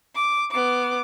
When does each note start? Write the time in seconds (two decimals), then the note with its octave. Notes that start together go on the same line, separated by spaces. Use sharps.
0.15 D6
0.51 B3 D6